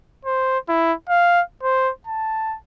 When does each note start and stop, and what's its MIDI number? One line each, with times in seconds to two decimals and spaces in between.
0.25 0.58 72
0.69 0.93 64
1.09 1.42 77
1.63 1.91 72
2.07 2.57 81